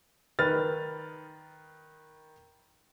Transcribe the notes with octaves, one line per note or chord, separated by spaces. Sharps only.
D#3 B4 F6 A6